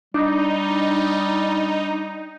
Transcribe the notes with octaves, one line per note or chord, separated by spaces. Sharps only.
G3 D4 D#4